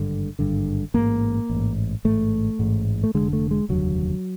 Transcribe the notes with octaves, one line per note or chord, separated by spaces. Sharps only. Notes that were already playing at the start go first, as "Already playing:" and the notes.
Already playing: G#1 G2 D3
G#1 G2 D3
A1 G#2 A#3
A1 G#2
A1 G#2 A3
A1 G#2
A3
F1 D#2 D3 G#3
A3
G#3
F1 D#2 D3 F#3